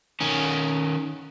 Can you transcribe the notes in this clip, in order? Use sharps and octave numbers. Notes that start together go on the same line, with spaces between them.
D#3 C#4